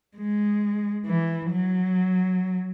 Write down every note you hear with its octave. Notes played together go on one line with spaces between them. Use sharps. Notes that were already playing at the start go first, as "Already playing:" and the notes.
G#3
E3
F#3